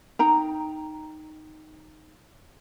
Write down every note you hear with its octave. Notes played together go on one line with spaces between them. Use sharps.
D#4 G5 A#5